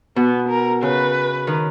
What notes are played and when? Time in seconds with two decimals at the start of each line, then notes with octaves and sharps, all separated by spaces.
0.16 B2 B3
0.49 A#4
0.82 C#3 B4
1.47 D#3